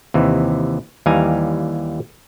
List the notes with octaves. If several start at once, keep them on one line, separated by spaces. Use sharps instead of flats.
D#2 C3 E3
D#2 E3 G3 F5 G#5 A#5